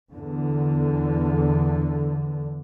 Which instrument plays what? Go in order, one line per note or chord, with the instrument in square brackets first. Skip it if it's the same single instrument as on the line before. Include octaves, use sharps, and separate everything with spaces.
[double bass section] E2 D3